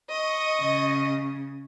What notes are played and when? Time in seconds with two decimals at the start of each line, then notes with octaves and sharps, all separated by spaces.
0.12 D#5 C#6
0.62 C#3